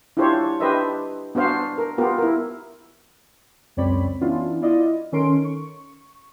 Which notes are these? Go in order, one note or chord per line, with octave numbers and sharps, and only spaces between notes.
D4 E4 F4 G4 C5 C#5
D4 G4 B4 C5 D#5 E5
B3 D4 F#4 C5 F5
A#4
B3 F4 G4 A#4
E4 A#4
C#2 F#2 C4 C#5 D5 B5
E3 B3 C#4 D4 E4 F4
E4 F4 D5 D#5
D#3 C#4 A4 A#4 C6 D7
C#6